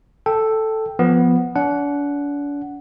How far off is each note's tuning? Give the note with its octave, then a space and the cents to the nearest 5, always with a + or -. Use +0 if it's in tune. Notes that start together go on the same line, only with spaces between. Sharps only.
A4 +0 G5 +0
F3 +0 B3 +0
D4 -40 F#5 +0